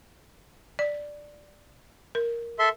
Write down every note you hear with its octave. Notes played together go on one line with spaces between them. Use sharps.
D5
A#4
A4 E5 C6